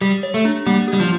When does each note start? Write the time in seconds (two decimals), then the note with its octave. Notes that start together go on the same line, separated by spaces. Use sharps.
0.01 G3 G4
0.23 C#5
0.34 A3
0.45 D4
0.66 G3 A#3
0.88 G4
0.93 G3
1.00 F3